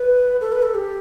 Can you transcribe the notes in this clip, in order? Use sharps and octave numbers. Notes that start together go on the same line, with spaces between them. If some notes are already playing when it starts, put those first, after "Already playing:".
Already playing: B4
A4
B4
A4
G4